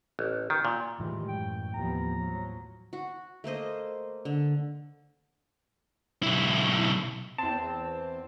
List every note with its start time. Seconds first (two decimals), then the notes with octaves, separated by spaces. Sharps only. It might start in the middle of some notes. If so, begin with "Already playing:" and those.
0.19 A1
0.50 D#3
0.65 A#2
1.00 A2 D#3 E3 G3 G#3 F4
1.28 F#2 G5
1.74 D#2 F3 B3 A#5
2.14 F3 F#3
2.93 F#4
3.44 A3 A#3 C5 D#5
4.25 D3
6.23 B1 E4
7.38 E2 C4 A5